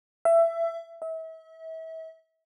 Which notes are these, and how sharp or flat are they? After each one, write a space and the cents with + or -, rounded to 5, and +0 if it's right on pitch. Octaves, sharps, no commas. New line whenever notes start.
E5 +20
E5 -35